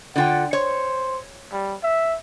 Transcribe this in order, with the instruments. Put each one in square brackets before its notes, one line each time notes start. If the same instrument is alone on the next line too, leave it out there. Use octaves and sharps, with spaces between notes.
[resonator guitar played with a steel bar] D3 F4 G5 [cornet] F#5
[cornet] C5 [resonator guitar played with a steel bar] C#5
[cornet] G3
E5